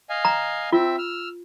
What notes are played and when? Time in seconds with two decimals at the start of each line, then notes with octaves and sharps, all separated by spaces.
0.09 D#5 F5 G#5
0.25 A#5
0.72 C4 F4 E5
0.98 E6 F6